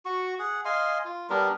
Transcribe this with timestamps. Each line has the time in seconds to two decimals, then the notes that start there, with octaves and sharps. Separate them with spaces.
0.05 F#4 C#6
0.39 G#4 F#5
0.65 D#5 F5 G#5 C6
1.05 F4
1.30 G3 B3 D4 A#4